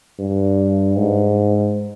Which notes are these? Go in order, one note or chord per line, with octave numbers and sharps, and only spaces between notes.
G2
G#2